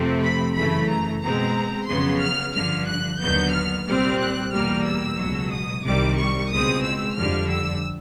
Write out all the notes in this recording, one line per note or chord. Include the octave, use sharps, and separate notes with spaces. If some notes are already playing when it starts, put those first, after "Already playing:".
Already playing: F2 C3 F3 A3 C4
B5
F#2 C#3 E3 A3 B5
A#5
B2 G#3 C4 A#5
F2 C#3 F#3 B3 C6
F6
G2 D3 F3 F6
F#6
D#2 D3 F#3 B3 G6
F6
C2 A#2 G3 C4 F6
F#6
E2 B2 G3 A#3 F6
E6
C#2 B2 F#3
D#6
C2 C3 D#3 G3 D6
C#6
C#2 B2 G#3 C4 D#6
E6
F2 D3 G3 F6
E6